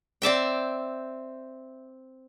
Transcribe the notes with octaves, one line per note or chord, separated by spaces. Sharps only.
C4 D5 E5 G5